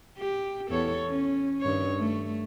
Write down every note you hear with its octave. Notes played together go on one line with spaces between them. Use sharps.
G4
E2 A4 C#5
C#4
G2 D#3 C#5
A3